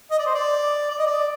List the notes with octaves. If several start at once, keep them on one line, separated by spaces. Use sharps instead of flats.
D#5
D5
C5
D5
D5
D#5
D5